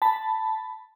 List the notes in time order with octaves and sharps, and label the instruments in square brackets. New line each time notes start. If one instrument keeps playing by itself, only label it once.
[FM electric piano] A5 B5